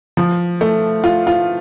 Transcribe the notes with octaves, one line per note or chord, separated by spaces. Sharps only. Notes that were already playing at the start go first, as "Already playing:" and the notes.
F3
A3
F4
F4